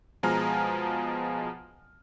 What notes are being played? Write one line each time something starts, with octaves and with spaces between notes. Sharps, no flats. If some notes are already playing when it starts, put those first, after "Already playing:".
B2 F3 G#3 G#5 A#5 F6